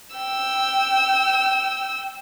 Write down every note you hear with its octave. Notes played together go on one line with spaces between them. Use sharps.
G5 E6